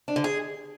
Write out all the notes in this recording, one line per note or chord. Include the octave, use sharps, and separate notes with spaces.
D4
D3
G#4